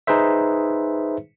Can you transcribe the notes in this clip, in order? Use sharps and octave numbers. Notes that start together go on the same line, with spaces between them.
D#4 G#4 B4 C5 E5